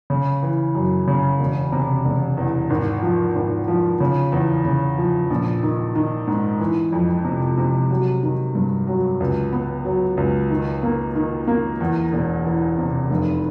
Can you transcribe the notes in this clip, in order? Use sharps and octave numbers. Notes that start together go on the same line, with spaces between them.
C#3
E3
F#2
C#3
E1
C3
E1
E2
G#1
F3
G#1
F3
C#3
E2
C#3
F3
A#1
D#3
D#3
G#2
E3
F2
C3
C3
F#3
D#3
G2
F#3
C#2
B3
F#3
C#2
D#3
A#3
D#3
A#3
E2
E1
E3
C3
F1